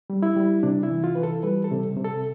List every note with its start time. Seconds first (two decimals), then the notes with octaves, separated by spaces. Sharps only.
0.10 G3
0.23 E4
0.36 G3
0.63 C3 D4
0.83 E4
0.90 E3
1.04 F4
1.15 E3 B4
1.23 A4
1.43 G3 B4
1.64 A4
1.71 C3
1.97 C3
2.05 A4